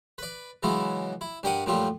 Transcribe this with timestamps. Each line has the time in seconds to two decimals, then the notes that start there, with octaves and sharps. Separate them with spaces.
0.18 B4 D5
0.63 C#3 E3 F#3 G#3 B3 E4
1.21 E4
1.43 G2 G4 A#4 D5 F#5 D#6
1.66 F#2 A#2 F3 G3 A3 F4